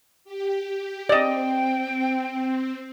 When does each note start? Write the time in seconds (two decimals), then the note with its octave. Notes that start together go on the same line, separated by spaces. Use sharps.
0.24 G4
1.09 C4 D5 D#5 G5